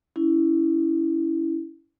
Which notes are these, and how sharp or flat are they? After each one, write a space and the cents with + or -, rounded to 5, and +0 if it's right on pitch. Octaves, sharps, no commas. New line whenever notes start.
C#4 +30 E4 +0